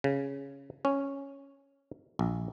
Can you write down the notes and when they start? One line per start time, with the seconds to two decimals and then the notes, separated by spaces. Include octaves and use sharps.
0.04 C#3
0.85 C#4
2.19 A#1